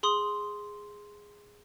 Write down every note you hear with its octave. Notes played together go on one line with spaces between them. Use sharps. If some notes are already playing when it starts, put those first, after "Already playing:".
G#4 C6 D#6